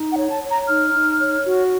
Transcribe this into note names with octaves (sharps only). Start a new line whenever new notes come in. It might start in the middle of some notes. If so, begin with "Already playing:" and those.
Already playing: D#4
F#5
C#5
A5
C#5
A#5
D#4 F6
D#4
C#5
F#4